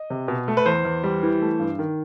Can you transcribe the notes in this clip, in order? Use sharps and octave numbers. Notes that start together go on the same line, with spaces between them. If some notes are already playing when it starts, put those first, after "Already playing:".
Already playing: D#5
C3
B2
A3
B4
E2 C5
E2
G3
E3
A3
G2
D#3